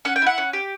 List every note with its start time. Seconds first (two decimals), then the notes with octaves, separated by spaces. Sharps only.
0.05 C#4 F#5
0.16 G5
0.22 E4 F#5
0.38 C#4
0.53 G4